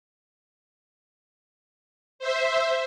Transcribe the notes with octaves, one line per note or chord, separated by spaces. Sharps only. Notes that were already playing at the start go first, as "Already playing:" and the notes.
C5 E5